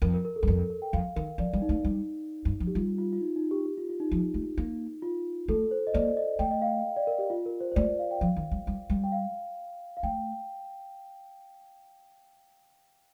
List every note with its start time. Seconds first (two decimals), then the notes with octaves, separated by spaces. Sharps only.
0.02 F2 A#4
0.14 A#4
0.25 A#4
0.36 A4
0.43 G2
0.47 F2 A#4
0.59 A#4
0.70 A#4
0.82 G5
0.93 F2 F5
1.16 D#3 A#4
1.38 F3 D5
1.53 G3
1.62 D#4
1.69 A3
1.85 G3
2.45 G2
2.60 F3
2.67 G4
2.75 G3 F4
2.98 F4
3.13 F4
3.21 D#4
3.36 D#4
3.51 G4
3.66 G4
3.78 F4
3.89 F4
4.00 D#4
4.11 F3
4.34 A3
4.58 A#3
5.02 F4
5.48 A3 A4
5.71 C5
5.87 D#5
5.94 A#3 D5
6.17 D#5
6.39 A3 G5
6.51 D#5
6.62 F5
6.97 D5
7.07 A#4
7.19 G4
7.30 F4
7.46 A#4
7.61 C5
7.72 C5
7.76 A3 D5
7.99 F5
8.11 G5
8.21 F3 F5
8.36 D#3
8.52 G3
8.67 G3
8.90 G3
9.04 G5
9.12 F5
9.97 F5
10.03 A3 G5